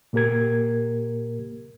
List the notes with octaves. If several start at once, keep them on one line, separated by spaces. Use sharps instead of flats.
A#2 A#3 G4 A#4 G#6